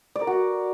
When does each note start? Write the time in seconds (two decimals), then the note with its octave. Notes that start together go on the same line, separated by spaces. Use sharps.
0.16 D5
0.21 A#4
0.27 F#4